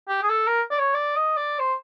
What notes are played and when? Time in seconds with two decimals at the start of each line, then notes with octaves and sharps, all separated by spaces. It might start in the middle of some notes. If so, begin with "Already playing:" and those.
0.09 G4
0.22 G#4
0.30 A4
0.47 A#4
0.71 D5
0.78 C#5
0.94 D5
1.16 D#5
1.37 D5
1.59 C5